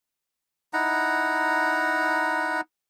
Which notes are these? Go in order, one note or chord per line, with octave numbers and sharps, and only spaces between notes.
D#4 E4 F#5 A#5